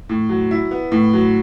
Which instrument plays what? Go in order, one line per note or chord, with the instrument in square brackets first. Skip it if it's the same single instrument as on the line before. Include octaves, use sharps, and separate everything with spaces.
[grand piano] A2
F#3
E4
B3
A2
F#3